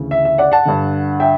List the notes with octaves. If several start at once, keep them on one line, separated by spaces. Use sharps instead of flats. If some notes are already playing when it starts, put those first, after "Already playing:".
Already playing: D2 C#3 E3
E5
E5
D5 F#5
F#5 A5
G2 D3
E5 G5